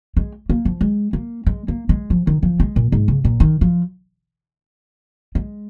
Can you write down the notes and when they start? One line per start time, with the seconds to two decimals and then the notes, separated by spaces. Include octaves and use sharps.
0.17 G#3
0.50 A#3
0.65 F3
0.81 G#3
1.13 A#3
1.47 G#3
1.68 A#3
1.89 G#3
2.10 F3
2.27 D#3
2.43 F3
2.60 G#3
2.76 A#2
2.92 G#2
3.08 C#3
3.25 A#2
3.40 D#3
3.61 F3
5.35 G#3